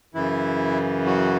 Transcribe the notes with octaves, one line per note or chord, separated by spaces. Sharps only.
F#2 C#3 E3 E4
F#3 F#4